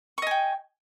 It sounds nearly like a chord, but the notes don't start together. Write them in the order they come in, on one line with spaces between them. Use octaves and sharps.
C#6 D#5 G#5 G5